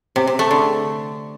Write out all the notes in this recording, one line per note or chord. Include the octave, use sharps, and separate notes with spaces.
C3
C3
A3
D3